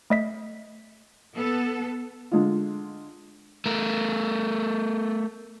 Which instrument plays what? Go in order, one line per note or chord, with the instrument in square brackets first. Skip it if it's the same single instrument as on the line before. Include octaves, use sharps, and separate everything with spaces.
[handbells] A3 D#5 B6
[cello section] B3 A4
[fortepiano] D3 G#3 F4
[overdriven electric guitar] A3 A#4